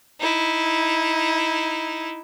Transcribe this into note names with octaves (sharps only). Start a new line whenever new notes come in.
D#4 E4